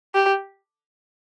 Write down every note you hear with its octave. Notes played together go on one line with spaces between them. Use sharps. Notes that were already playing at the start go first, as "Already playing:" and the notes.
G4